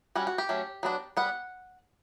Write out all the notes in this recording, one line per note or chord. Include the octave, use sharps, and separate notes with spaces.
G3 C#4 F#4
F#4
G4
F#3 A3 C#4
F#3 B3 D4
G3 B3 F#5